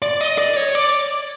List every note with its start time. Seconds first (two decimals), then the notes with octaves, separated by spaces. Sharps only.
0.02 D5
0.21 D#5
0.38 D5
0.56 C#5
0.75 D5